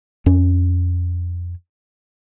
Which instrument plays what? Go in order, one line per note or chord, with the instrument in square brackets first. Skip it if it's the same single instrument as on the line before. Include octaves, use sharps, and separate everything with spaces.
[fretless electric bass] F2 C#4